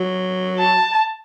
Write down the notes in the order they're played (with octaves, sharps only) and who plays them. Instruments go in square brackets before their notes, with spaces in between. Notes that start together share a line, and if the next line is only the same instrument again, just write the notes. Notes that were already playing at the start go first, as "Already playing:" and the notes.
Already playing: [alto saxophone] F#3
[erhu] A5